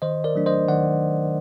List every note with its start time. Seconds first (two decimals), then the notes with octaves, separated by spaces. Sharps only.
0.02 D#3 C5 D#5
0.24 A#4 D5
0.35 F#3 A3 D4
0.46 C5 D#5
0.68 D#3 D5 F#5